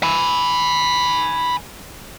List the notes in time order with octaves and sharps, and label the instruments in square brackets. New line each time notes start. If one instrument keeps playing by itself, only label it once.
[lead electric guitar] G#5 B5